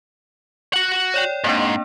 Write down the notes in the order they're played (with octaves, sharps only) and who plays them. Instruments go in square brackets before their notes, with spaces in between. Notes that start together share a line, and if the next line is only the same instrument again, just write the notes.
[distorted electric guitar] F#4 F#5
[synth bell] C#5 D5 G5
[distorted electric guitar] G#2 [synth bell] A#3 C4 D4